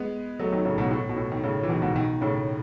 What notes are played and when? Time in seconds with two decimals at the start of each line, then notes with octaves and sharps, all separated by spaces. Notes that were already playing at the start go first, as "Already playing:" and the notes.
Already playing: G#3 B3
0.39 F#3 A3
0.52 D#3 F#3
0.65 A2 C#3
0.78 G#2 B2
0.91 A2
1.09 B2
1.17 A2
1.32 D#3
1.43 A2 C#3
1.63 E3
1.69 B2 D#3
1.82 G#2 B2
1.95 B2 D#3
2.21 A2 C#3